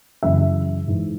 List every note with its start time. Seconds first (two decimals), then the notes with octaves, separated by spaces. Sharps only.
0.23 F#2 C#3 E3 E5
0.87 G#2 E3